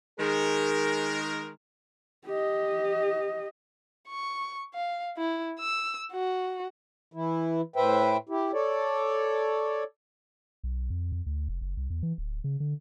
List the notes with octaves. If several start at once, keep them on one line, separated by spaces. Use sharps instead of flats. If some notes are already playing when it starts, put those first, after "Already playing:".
D#3 G#3 G#4 A#4
G4 D#5
C#6
F5
E4
E6
F#4
E3 E4
A2 B4 C5 E5 G5
E4 G4
A4 C#5 D5
B1
F2
F2
D2
F1
F#1
C2
E2
E3
D1
C#3
D3